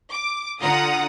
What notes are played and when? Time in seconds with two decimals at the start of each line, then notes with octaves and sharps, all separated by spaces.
0.13 D6
0.61 D3 F4 F#5 A#5 D#6